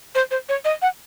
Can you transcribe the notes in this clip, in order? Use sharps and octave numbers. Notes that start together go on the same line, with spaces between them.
C5
C5
C#5
D#5
F#5